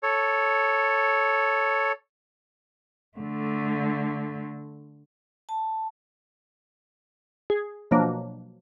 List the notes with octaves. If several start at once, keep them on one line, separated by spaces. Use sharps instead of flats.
A4 C#5
D3 A3
A5
G#4
B2 F3 F#3 A#3 D4